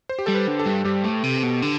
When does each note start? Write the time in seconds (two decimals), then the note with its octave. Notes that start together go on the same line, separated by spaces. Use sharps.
0.09 C5
0.19 G4
0.26 G3 A4
0.35 B4
0.48 D3
0.60 A4
0.66 G2
0.85 G2 G4
1.04 A2
1.24 C3
1.43 B2
1.62 D3